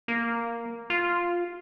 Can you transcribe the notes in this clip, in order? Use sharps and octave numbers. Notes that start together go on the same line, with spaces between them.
A#3
F4